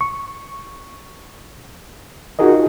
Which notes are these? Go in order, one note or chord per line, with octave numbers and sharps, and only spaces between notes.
C#6
D#4 F4 F#4 G#4 A#4 D#5